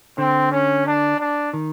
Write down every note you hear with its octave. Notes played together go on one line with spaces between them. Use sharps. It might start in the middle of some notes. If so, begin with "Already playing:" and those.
D3 C4
C#4
D4
D4
D#3